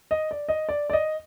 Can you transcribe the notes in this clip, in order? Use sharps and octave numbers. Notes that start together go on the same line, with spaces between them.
D#5
D5
D#5
D5
D5
D#5